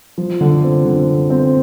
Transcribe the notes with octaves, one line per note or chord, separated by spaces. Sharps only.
F3
D3
C4
D3
C4
C4